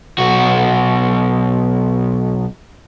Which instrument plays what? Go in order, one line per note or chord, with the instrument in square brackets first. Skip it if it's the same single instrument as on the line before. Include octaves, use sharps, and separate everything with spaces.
[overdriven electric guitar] B1 F#4